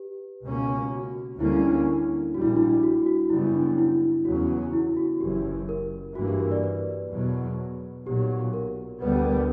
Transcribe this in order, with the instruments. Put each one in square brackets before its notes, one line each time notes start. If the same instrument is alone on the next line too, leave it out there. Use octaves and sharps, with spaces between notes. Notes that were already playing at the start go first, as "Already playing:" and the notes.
Already playing: [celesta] G4 B4
[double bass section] C#2 B2 A#3 C#4
[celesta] F#4
[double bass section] D2 D3 G3 A#3 C#4 [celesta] E4
[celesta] E4
D4
[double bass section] A#1 A#2 G3 [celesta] F#4
[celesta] E4
D4
E4
F#4
F#4
[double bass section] F#2 C#3 G3 B3 [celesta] E4
[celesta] D4
E4
[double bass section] E2 C#3 F#3 C#4 [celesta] F#4
[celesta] E4
F#4
[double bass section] F#1 F#2 E3 [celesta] G4
[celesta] A#4
[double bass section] G2 E3 A#3 [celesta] F#4
[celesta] G4
A#4
D5
B4
[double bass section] E2 B2 F#3
[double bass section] B1 A#2 F#3 [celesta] G4
[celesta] A#4
[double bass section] D2 D3 G3 B3 [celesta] B4
[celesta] A#4